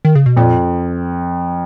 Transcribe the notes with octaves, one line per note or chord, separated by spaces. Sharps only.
D#3
C#3
B2
F2 A#2